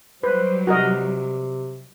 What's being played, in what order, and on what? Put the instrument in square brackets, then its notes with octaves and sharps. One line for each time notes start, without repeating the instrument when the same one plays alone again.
[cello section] F#3 G3 [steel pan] B4 [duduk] C5
[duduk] C3 [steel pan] F#4 A#4 D#5